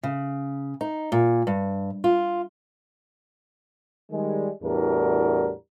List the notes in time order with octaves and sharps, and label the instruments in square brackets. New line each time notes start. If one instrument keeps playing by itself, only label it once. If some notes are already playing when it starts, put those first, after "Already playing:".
[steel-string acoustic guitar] C#3
D#4
A#2
G2
F4
[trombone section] D#3 G3 G#3
E2 A2 G3 D4 F#4 A#4